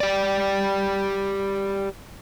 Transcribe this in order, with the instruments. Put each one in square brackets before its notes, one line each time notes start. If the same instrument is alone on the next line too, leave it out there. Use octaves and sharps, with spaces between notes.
[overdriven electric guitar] G4 D5